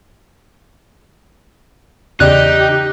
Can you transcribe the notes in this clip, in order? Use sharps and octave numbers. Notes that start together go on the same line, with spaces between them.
E2 C#3 D#4 G4 D5 F#6